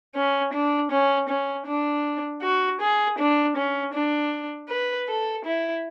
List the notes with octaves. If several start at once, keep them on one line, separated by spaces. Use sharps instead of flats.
C#4
D4
C#4
C#4
D4
F#4
G#4
D4
C#4
D4
B4
A4
E4